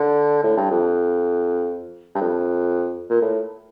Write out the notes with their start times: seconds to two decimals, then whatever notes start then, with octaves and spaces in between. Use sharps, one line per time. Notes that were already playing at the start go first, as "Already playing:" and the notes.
Already playing: D3
0.44 A2
0.57 G2
0.71 F2
2.15 G2
2.22 F2
3.10 A#2
3.22 A2